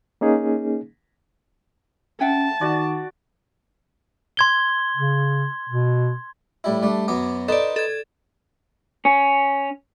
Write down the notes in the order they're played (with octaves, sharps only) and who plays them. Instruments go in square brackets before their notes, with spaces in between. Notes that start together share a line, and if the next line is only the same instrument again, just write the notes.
[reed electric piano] A#3 C#4 D#4 G#4
[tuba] C#4 [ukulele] E5 F#5 G5 [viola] A5
[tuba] D#3 [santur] F#4 D5
[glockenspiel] C6 G#6 G7
[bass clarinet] C#3
B2
[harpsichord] A2 G3 E4
G3 A3 D4
[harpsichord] F#2 F#3 B3 [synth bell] D6
[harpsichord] D#4 B4 C5 [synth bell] A4 D5
[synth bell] A4 G#6
[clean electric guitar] C#4